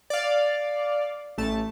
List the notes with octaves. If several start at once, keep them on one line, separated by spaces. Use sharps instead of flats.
D5 F5
A1 A3 A5